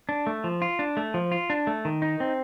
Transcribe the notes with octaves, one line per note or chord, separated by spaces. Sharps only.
D4
A3
F3
F4
D4
A3
F3
F4
D4
A3
D#3
D#4
C4